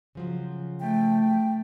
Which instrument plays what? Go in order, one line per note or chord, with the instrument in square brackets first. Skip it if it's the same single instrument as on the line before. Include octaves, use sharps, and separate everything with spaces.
[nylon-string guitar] C#3 F3 F#3
[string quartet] A3 [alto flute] G5